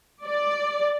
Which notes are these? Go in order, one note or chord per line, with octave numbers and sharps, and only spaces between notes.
D5